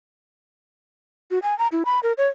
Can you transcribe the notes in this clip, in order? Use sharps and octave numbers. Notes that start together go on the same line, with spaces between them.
F#4
G#5
A#5
E4
B5
A#4
C#5